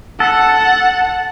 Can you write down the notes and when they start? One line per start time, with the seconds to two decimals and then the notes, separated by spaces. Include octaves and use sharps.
0.20 A4 F#5